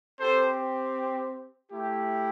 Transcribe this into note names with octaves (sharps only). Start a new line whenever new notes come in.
C4 G4 A4 C5
A3 E4 G4